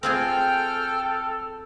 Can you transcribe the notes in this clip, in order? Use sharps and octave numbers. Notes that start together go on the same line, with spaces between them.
C4 F4 G#4 A4 G5 F6